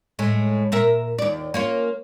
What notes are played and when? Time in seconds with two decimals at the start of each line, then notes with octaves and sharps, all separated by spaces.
0.19 A2 G#3
0.72 A#2 A#4 E5
1.18 D#2 D5
1.54 A#3 C#4 F4